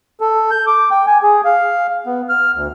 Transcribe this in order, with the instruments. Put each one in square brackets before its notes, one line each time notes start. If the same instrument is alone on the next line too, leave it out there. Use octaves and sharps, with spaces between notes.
[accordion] A4
G6
D6
G5
G#5
G#4
F5
B3
F6
D2